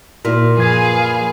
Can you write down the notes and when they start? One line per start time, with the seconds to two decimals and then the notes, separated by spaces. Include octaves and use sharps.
0.25 A#2 A#3 E4 F#4
0.57 F#2 F3 G#4 B4 F5 G#6